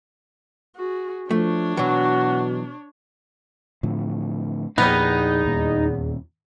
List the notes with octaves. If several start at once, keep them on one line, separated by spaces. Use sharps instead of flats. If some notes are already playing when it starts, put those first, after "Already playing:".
F#4 G#4
F3 A3 D4 C#5
B2 E3 F#3 F#4
A2 D3 F3
E2 A#2 F3 G3 A#3 B3 D#4
D#2 A#2